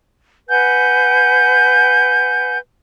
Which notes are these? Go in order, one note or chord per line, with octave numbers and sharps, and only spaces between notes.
B4 F#5 G#5 G6